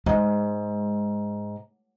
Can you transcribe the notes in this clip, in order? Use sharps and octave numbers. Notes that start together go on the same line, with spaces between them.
G#2 G#3